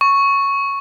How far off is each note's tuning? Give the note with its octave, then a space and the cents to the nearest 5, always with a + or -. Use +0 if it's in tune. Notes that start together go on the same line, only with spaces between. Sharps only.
C#6 +0